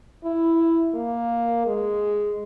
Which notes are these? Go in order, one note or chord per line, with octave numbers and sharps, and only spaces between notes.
E4
A#3
G#3